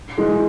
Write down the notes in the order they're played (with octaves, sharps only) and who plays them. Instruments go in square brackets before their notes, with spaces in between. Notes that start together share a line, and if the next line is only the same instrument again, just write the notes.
[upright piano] E3 G#3